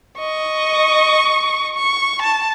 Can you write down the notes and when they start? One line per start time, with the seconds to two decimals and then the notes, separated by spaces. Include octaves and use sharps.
0.19 D#5 C#6
1.75 C#6
2.22 A5